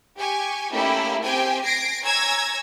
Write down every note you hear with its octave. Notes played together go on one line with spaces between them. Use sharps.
G4 G#5 C#6
A3 A#3 C#4 D#4 E4 G4
C4 G4 G5 G#5
G#6 A#6 C7 D7
C#5 G#5 A#5 E6 G#6 A#6